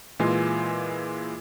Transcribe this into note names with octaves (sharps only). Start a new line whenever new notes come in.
A#2 E3 G#3 F4 G#5